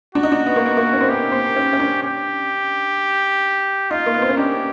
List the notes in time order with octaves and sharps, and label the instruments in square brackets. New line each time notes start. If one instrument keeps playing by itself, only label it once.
[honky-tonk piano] D4 [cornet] F#4
[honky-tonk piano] D#4
D4
B3
A#3
B3
A#3
C#4
C4
[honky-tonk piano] B3 [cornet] G4
[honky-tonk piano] C4
C#4
C#4
D4
[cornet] G4
[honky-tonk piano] D#4 [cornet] F4
[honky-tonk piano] A#3
B3
C4
C#4
[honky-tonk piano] D4 [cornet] G4